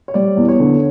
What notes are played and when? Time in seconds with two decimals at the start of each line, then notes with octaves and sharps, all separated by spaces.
0.08 C#5
0.14 G3 D5
0.37 E2
0.48 C#5
0.60 D3